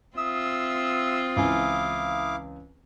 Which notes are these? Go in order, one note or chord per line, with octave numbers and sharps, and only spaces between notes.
C4 F4 E5 D#6 E6
C#2 E3 E4 F5 G#5 D6